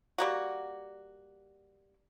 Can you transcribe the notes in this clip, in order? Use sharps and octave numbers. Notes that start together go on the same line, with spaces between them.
G3 A#3 F#4